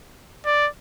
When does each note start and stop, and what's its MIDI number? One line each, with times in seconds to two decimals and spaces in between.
0.45 0.68 74